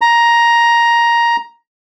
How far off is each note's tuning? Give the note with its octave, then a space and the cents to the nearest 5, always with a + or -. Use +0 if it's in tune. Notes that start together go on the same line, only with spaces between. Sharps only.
A#5 +10